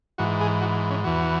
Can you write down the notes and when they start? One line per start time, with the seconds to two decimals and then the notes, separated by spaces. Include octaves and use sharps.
0.18 G#2 E3 F#4
0.41 G#4
0.61 F#4
0.90 C#4
1.04 E2 E3 F#4